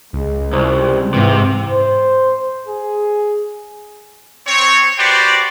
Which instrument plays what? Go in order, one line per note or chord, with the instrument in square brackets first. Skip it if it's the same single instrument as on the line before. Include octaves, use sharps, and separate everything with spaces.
[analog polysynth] C#2 [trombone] G#3
[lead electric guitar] C2 [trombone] C5
[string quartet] G#2 [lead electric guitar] C3 [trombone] E3
[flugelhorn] C5
G#4
[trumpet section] C4 C#5
F#4 G4 B4 C5 D5 G5